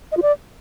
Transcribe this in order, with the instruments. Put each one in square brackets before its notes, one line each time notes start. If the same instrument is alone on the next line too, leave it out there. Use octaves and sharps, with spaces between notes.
[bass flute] D#5
F4
D5